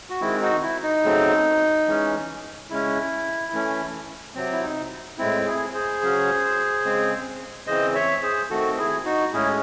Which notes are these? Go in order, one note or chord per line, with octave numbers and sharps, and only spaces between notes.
F#4
D#3 G#3 C4 E4
D#4 F#4
E4
D#4
C#3 F#3 A3 C4
E3 G#3 C#4
C#3 G#3 C#4 E4
E3 A3 C#4
C3 F#3 C4
E4
D#4
A2 G#3 C4 E4
E4 G#4
G#4 C5
C#3 F#3 C#4
C#3 G#3 C4
C#3 E3 C4 C5 D#5
C#5 E5
G#4 C5
D#3 A3 C4 F#4 A4
E4 G#4
D#4 F#4
A2 G#3 C#4 E4 G#4